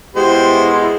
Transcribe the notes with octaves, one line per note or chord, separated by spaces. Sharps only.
B2 G#3 E4 G4 C5